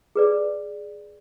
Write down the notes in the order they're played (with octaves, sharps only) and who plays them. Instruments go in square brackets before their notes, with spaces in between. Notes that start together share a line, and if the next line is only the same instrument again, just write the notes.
[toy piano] G#4 B4 D5